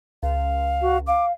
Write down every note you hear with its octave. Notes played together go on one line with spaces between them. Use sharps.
C#2 F5
F#4
F5 D6